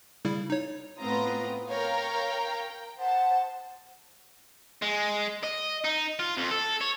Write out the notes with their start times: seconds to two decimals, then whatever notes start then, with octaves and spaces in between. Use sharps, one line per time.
0.25 C#3 G3 E4
0.50 D#4 C#5
0.99 A2 B3 C4 F4 A#5 D#6
1.67 A#4 C#5 F5 G5 A#5
2.99 C5 F#5 A5
4.82 G#3
5.43 D#5
5.84 D#4
6.19 F4
6.37 F2
6.51 A4
6.81 C#5